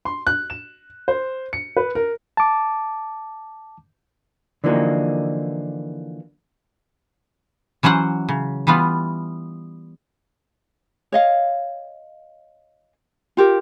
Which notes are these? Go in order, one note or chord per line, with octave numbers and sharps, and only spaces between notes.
C6
F#6
E7
C5
C#7
B4
A#4
A5 D6
D3 E3 F3 A#3 D#4 F#4
E3 F#3 C#4 C5 F#5
C#3
E3 G3 B3 F4
C#5 D#5 F5
F4 G4 A#4